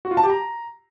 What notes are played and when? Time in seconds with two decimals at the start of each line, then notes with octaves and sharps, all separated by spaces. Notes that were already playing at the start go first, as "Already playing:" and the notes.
0.05 F#4
0.11 F4
0.17 A5
0.23 G4
0.30 A#5